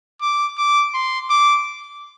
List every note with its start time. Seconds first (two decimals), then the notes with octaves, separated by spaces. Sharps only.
0.21 D6
0.57 D6
0.94 C6
1.30 D6